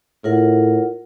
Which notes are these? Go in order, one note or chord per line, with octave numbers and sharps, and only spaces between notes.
A2 F4 A#4 F#5